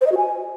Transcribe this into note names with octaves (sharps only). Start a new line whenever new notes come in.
C5
D#5
F#4
G#5